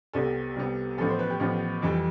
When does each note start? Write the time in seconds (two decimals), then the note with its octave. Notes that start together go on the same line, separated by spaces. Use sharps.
0.13 C2 C3 G3 B3 A4
0.56 C2 C3 G3 B3
0.98 A1 A2 F3 B3 A4
1.08 C5
1.19 B4
1.30 G4
1.40 A1 A2 F3 B3
1.82 F2 E3 G3